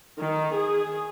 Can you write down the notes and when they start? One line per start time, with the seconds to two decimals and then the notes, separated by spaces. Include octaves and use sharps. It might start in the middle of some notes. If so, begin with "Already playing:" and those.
0.19 D#3
0.55 G#4